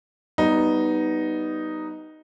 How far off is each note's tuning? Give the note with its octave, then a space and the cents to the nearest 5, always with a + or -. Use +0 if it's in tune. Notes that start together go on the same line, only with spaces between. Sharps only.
G3 -20 B3 +0 D#4 +0